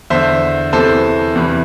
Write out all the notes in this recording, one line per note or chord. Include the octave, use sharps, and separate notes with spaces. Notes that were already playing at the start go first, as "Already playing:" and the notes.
E2 D3 C5 E5
E2 C3 E3 A4 C5
E2 C3 E3